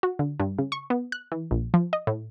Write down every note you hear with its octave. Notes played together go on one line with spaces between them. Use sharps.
F#4
D3
G2
C#3
C#6
B3
F#6
E3
A#1
F3
D#5
A2